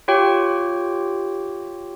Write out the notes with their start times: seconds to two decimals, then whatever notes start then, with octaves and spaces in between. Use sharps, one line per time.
0.08 F4 G4 C#5 G5